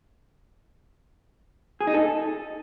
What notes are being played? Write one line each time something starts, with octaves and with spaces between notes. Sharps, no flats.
G#4
D#4
A4